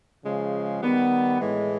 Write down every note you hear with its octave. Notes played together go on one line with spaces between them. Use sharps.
C#3 F3 G#3
D#3 G3 B3
A2 E3 G#3